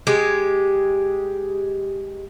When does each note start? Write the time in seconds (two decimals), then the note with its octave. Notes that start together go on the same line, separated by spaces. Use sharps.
0.07 G#3 G4